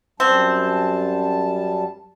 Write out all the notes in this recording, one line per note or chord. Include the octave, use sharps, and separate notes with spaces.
F#2 G3 C4 A5